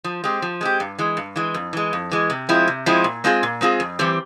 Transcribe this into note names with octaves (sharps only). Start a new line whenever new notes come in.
F3
G#3 C4 G4
F3
G#3 C4 G4
G2
E3 G#3
G2
E3 G#3
F2
E3 G#3
F2
E3 G#3
C3
F3 G#3 C4 E4
C3
F3 G#3 C4 E4
A#2
G#3 C4 F4 G#4
A#2
G#3 C4 F4 G#4
F2
E3 G3 C4 G4